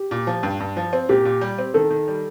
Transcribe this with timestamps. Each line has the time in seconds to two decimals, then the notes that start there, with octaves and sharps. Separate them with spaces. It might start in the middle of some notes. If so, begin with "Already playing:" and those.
Already playing: G4
0.11 A#2
0.27 F3
0.43 G2
0.60 G2
0.77 F3
0.93 C4
1.09 A#2 G4
1.25 A#2
1.41 G3
1.58 C4
1.74 D#3 A4
1.90 D#3
2.08 G3